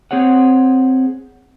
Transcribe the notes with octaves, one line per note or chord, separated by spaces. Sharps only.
C4 G#4 C#5 F#5